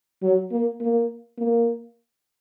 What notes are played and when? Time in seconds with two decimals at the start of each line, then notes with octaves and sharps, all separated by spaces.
0.23 F#3
0.51 A#3
0.81 A#3
1.38 A#3